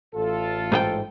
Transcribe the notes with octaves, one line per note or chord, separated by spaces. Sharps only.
A1 F4 A4
G#2 G#4 G5